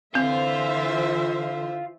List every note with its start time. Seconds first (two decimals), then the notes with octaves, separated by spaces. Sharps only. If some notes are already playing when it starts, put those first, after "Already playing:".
0.15 D3 E3 C4 F4 C5 E5